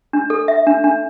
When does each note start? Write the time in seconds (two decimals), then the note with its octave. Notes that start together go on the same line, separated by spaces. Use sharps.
0.13 D4
0.30 A4
0.48 E5
0.67 D4
0.84 D4